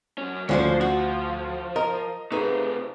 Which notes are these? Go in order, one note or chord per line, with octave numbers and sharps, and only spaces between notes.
F#2 C#4
D2 D3 F3 C#4 C5 C#5
F3 F#4
A#4 D#5
C3 A3 D#4 G#4 B4